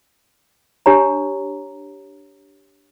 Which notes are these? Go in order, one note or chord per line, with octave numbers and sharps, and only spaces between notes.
D4 G4 C#5 A#5